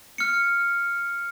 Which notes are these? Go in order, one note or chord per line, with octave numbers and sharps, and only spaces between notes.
F6 C#7